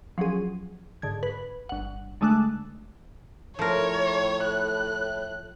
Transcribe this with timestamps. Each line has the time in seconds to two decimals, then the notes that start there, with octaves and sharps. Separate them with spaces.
0.18 F3 F#3 C#4 G#4
1.02 G#2 D3 G#6
1.23 B4
1.69 G1 F#5
2.21 D3 G#3 A3 D4 F#6
3.59 A2 F3 A#4 C#5
4.44 F#6